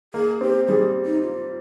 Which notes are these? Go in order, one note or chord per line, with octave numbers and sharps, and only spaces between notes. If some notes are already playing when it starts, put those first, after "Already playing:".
A#3 G#4
C4 G4
G3 G#4
D#4
F4